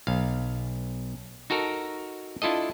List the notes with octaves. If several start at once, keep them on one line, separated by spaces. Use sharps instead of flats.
B1 F5
D#4 F#4 A4 A#4
D4 E4 F4 A4 D#5